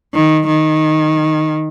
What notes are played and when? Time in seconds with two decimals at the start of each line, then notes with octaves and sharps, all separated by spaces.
0.14 D#3
0.47 D#3